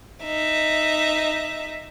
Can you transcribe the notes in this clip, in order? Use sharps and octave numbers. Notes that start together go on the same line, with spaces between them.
D#4 E5